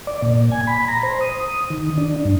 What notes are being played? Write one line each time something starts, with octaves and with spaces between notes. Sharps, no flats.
D5
A#2
G#5
B5
A#5
C5
D#6
D#3
D4
G2